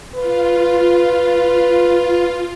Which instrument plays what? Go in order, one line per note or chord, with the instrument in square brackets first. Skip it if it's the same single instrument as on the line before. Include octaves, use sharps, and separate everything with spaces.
[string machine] F4 [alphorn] B4